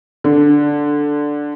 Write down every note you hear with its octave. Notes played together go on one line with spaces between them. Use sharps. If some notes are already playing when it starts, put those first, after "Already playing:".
D3